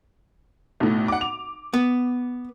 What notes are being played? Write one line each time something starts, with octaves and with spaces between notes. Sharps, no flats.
B1 A2
F#5 D6
F7
B3